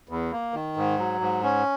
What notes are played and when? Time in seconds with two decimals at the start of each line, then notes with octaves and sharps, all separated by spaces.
0.09 E2
0.32 A#3
0.54 D#3
0.77 G#2
0.99 F#3
1.21 G#2
1.43 C#4